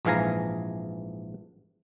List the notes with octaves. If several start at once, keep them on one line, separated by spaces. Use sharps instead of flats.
A#1 G#2 E3 F5 G#5 A#5